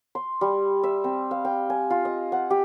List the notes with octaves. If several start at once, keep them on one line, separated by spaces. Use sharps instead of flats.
C6
G3
E5
C4
F5
G5
G#5
F4
D#5
F#5
G4